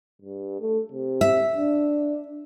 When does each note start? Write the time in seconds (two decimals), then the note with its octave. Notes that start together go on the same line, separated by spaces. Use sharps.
0.22 G2
0.60 A3
0.92 C3
1.21 E5
1.55 D4